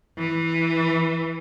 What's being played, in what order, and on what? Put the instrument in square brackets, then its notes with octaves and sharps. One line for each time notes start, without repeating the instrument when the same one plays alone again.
[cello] E3